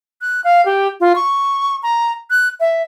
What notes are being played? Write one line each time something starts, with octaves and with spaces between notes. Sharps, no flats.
F#6
F5
G4
F4
C#6
A#5
F#6
E5